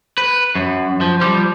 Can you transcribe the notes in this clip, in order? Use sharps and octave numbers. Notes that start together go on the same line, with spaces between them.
B4
F#2
F3
F3 G3